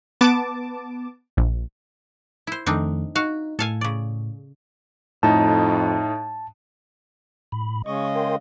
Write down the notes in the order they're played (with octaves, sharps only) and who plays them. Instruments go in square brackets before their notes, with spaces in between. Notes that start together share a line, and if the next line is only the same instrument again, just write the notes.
[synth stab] B3 A5 D6
A#1
[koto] E4 C5
[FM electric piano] F2 D#3 A3 [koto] C4 D4 D#4
[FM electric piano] D#4 [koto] F#4 F5
[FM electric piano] A2 [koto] A4 F5 G#5
[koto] C#3 D5
[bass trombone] F2 [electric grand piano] A2 D#4 [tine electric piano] A5
[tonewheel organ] A2 B5
[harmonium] C#3 G#3 D#5 [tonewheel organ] C#6
[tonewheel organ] A#4 G5 C6